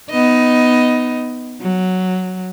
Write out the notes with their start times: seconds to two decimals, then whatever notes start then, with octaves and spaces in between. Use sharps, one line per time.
0.10 B3 D#4 D#5
1.61 F#3